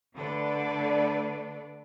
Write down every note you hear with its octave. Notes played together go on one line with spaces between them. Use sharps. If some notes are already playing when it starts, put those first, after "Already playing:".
D3 A3 D4 A4 B4 D5